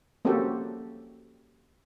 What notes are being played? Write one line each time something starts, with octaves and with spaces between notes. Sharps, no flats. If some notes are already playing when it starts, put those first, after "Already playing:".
A#3 C4 C#4 F#4 G4 A4